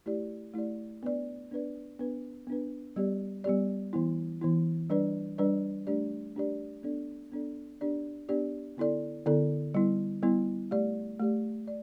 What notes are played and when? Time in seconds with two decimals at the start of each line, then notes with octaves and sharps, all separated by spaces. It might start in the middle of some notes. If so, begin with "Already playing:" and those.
0.06 A3 E4 G4 D5
0.54 A3 E4 G4 D5
1.03 B3 D4 B4 D5
1.51 B3 D4 B4 D5
1.99 B3 D4 B4
2.47 B3 D4 B4
2.96 G3 B3 G4 D5
3.44 G3 B3 G4 D5
3.93 E3 B3 E4
4.42 E3 B3 E4
4.90 G3 D4 B4 D5
5.38 G3 D4 B4 D5
5.87 A3 D4 G4 D5
6.35 A3 D4 G4 D5
6.83 B3 D4 A4 D5
7.32 B3 D4 A4 D5
7.81 B3 D4 G4 D5
8.29 B3 D4 G4 D5
8.77 D3 B3 E4 A4 D5
9.26 D3 B3 E4 A4 D5
9.74 G3 B3 E4
10.22 G3 B3 E4
10.71 A3 G4 D5
11.20 A3 G4 D5
11.68 D5